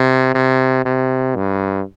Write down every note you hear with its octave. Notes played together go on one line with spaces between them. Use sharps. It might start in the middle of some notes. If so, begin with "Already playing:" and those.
Already playing: C3
C3
C3
G2